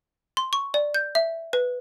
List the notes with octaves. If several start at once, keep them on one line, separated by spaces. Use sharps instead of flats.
C6
C#6
D5
G6
E5
B4